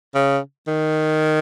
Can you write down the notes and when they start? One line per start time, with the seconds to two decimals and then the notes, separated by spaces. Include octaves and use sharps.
0.15 C#3
0.67 D#3